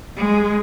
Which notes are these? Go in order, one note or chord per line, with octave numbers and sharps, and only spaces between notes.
G#3